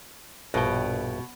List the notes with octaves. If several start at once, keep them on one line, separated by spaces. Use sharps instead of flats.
A#1 G2 B2 G5